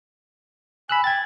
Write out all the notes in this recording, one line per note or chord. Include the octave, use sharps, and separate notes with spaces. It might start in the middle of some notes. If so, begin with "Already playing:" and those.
G#5 B5 E6 F#6
G5 G#6 A6